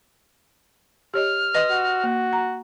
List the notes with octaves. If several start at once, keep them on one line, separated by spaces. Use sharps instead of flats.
G4 C#5 D#5 F6
B4 D#5 C6 D#6
F#4
A#3
A#5